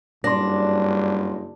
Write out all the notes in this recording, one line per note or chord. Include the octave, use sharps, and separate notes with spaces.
F#1 G2 D4 C6 A#6